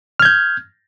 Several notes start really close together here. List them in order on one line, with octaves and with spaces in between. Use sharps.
F6 G#6 G6